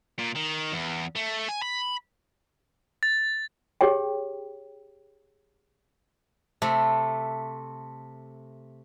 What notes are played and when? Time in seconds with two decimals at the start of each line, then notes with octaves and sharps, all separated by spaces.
0.18 A#2
0.35 D#3
0.72 E2
1.15 A3
1.49 G#5
1.62 B5
3.03 A6
3.81 G4 G#4 C#5 G5
6.62 C3 A3